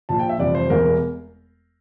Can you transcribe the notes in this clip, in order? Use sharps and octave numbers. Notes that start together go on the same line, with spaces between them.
A#1 A#2 F3 A5
G5
E5
F1 F2 E3 G3 D5
C5
E1 E2 E3 G3 A#4
A#4